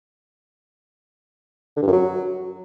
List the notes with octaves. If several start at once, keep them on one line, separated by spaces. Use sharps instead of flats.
D3
G2
F#2
F#3